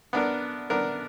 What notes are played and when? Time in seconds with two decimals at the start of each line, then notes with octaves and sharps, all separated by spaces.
0.13 B3 D4 A#4
0.70 B3 D4 A#4